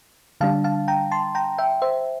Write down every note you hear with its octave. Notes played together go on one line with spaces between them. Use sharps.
D3 G3 D4 F5 A5
F5 A5
G5 A#5
A5 C6
G5 A#5
E5 G5
C5 E5